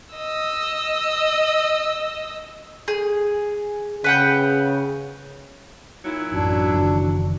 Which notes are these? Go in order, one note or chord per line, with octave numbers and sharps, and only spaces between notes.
D#5 E6
G#4
C#3 B4 F#5 G5
A#2 F#3 D#4 E4
A1 F#2 D4 F#4
F#1 D#3 E3